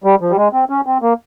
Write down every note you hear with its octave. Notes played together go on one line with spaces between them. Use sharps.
G3
F3
G3
G#3
C4
C#4
C4
A#3